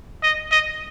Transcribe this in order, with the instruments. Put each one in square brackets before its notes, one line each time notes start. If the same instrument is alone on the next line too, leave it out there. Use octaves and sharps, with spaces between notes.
[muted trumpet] D#5
D#5